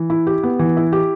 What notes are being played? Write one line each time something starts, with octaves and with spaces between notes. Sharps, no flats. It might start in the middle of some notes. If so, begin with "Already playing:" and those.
Already playing: E3
E4
G4
B3
E3
E4
G4